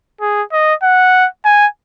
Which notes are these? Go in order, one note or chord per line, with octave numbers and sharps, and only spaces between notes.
G#4
D#5
F#5
G#5